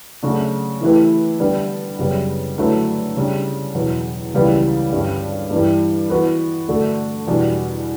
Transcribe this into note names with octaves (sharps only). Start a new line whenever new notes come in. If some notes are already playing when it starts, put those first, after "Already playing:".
C#3 F#3 A3 D4 F#4
E3 A3 E4 G4 B4
D3 G3 B3 D4
F#2 C#3 G3 B3
D3 F#3 A3 E4 B4
C#3 G3 D4
E2 B2 F#3
C#2 C#3 E3 G3 B3
G2 D3 G3 C#4
G2 E3 G3
E3 B3 F#4 B4
D3 A3 D4 F#4 A4
E2 B2 G3 D4